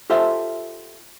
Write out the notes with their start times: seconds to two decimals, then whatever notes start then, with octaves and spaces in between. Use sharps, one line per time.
0.10 F4 G4 A4 C5 E5 F5